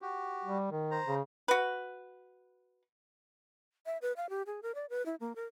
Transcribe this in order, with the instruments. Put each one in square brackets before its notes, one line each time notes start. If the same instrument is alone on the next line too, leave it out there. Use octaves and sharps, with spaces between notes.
[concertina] F#4 G4
[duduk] G3
D#3
[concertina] C5 A#5
[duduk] C#3
[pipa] F#4 B4
[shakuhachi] E5
B4
F5
G4
G#4
A#4
D5
B4
E4
A#3
A#4